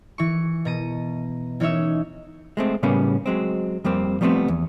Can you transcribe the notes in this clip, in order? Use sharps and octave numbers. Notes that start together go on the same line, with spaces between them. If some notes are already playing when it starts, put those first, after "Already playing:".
E3 C#6
B2 A#5 D#7
E3 C#4 D#4 C#5 E5
G#3 A3 C4
A2 C#3 G3 A#3 B3 C#4
F#3 G#3 C4
F2 G3 A#3 C4
F3 G3 A3 B3 C4
E2